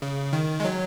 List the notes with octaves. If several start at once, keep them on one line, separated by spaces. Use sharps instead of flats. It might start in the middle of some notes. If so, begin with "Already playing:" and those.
C#3
D#3
G#3
F#3